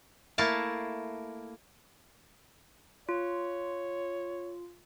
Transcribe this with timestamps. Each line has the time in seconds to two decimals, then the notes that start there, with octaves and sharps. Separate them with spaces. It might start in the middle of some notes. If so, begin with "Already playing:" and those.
0.38 A3 A#3 E4 F5 A5
3.09 F4 C#5